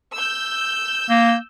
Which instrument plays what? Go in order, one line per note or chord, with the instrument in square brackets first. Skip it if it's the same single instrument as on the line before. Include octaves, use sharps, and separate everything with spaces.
[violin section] E6 G6
[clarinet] A#3